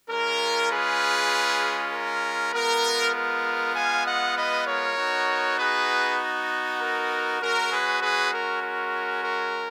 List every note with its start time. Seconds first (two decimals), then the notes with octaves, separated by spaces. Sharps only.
0.10 G#3 C#4 F4 A#4
0.72 G#4 B4
1.92 A#4
2.54 G#3 B3 F4 A#4
3.15 A#4
3.76 F5 G#5
4.06 D#5 F#5
4.36 B4 D#5
4.67 A#4 C#5
4.97 B3 D#4 F#4
5.58 G#4 B4
6.80 A#4
7.41 G#3 C#4 F#4 A#4
7.71 G#4 B4
8.02 G#4 B4
8.32 A#4
8.62 A#4
9.24 A#4